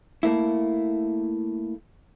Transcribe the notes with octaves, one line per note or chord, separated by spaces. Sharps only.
A3 A#3 E4